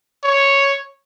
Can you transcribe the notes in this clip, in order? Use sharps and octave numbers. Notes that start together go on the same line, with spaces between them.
C#5